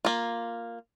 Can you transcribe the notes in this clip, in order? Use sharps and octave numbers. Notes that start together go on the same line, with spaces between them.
A#3 F4